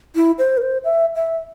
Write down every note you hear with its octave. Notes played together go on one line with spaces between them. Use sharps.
E4
C5
A#4
C5
E5
E5